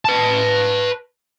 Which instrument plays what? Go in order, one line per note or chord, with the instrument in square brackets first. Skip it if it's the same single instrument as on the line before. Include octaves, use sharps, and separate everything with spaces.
[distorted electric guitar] B4 A5